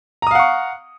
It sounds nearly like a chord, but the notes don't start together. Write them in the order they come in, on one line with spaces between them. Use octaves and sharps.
A#5 D#6 F5 F#5 C#6